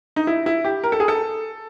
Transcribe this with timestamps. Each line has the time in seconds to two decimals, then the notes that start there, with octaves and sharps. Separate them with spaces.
0.16 D#4
0.27 E4
0.46 E4
0.65 G4
0.84 A#4
0.92 A4
1.00 G#4
1.08 A4